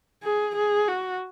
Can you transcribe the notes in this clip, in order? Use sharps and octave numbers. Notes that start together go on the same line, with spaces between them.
G#4
G#4
F#4